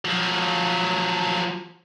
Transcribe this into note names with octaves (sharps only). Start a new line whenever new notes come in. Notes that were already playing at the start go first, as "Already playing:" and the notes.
F3 F#3